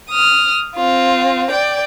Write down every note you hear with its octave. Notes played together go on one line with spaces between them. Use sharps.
D#6 F6
C4 F4
D5 G5